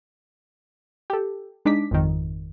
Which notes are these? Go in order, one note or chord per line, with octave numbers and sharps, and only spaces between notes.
G4 A4
G#3 D4 D#4 D6 B6
G#1 F2 D#3